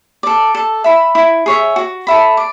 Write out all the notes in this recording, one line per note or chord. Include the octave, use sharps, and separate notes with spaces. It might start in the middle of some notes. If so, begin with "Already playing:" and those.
A4 D5
A4
E5 B5
E4
G#4 C#5 E5
F#4
A4 E5 B5
D5